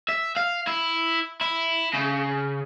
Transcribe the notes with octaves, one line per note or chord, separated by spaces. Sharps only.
E5
F5
E4
E4
C#3